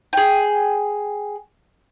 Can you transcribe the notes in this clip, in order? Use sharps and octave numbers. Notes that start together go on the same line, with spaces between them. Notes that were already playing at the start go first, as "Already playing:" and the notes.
G#4 G5